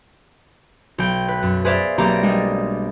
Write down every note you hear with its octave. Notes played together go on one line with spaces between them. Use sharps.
B1 G5
B4 F#6
F#2
G#4 B4 C5 D5 E5 F5
B1 A#3 C4 G4 D5 A#5
G3 G#3 D4